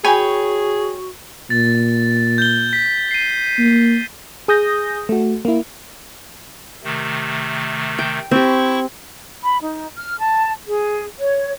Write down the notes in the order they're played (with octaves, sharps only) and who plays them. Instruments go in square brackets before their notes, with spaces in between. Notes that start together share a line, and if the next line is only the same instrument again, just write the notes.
[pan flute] F#4 [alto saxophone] G#4 [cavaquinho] C#5 G5 B5 [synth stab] G#5
[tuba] A#2 [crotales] A6
[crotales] G6 G7
B6
C7 D#7
[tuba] A#3
[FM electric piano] G#4 D#6 G6 A#6
A3 F#4
A#3 E4
[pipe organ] C3 D#3 A3
[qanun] G5
[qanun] C4 G4 [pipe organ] E4 C#6
[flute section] B5
D#4
F6
A5
G#4
C#5